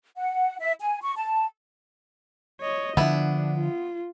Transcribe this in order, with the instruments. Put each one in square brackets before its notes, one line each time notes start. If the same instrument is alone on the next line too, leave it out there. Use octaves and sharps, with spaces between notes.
[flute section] F#5
E5
G#5
C#6
A5
[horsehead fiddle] C#5 D#5
[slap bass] D3 F3 [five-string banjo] B3 E4 [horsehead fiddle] D4
[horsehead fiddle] F4